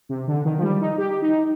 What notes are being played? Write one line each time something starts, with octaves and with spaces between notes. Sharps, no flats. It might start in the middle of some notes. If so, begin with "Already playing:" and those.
C3
D3
D#3
F3
G3
D#4
G4
D#4